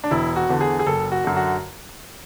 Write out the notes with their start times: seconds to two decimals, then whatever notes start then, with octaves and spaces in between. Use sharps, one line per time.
0.04 D4
0.11 E1 E4
0.36 F#4
0.49 E2 D3
0.61 G#4
0.79 G#4
0.86 F#1 A4
1.12 F#4
1.24 F#2 D3
1.36 F#4